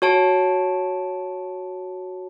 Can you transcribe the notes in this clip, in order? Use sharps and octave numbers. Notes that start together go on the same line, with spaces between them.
F#4 C#5 A5 D7